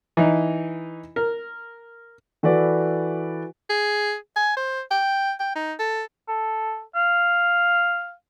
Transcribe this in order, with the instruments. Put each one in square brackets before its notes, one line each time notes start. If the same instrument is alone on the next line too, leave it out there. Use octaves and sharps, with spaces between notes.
[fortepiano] E3 D#4
A#4
[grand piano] E3 F#4 A4 B4 D5
[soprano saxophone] G#4
G#5
C5
G5
G5
D#4
A4
[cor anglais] A4
F5